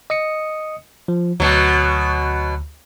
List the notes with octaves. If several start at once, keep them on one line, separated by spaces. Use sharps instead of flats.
D#5 D#6 C#7
F3
D2 B2 F#3